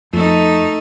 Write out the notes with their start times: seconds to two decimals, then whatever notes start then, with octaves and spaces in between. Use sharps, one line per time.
0.13 F2 A3 D#4